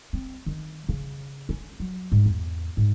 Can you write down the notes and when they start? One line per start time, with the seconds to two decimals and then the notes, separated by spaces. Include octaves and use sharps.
0.13 C4
0.46 D#3
0.89 C#3
1.49 C#4
1.80 F#3
2.12 G#2
2.26 E2
2.77 G#2